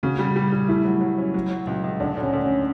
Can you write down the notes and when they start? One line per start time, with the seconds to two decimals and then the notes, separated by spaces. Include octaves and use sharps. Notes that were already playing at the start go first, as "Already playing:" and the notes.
0.03 C#3 F#4
0.19 G3
0.36 G3
0.52 G3
0.68 A3 E4
0.85 F#3
1.01 F#3
1.18 C#4
1.34 F#3
1.51 F#3
1.67 C#2
1.84 C#2
2.00 D2 D4
2.17 D2
2.22 C#4
2.33 D2
2.44 C#4